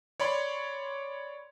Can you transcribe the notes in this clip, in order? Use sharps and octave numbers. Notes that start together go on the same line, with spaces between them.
C#5 D5 B5 C6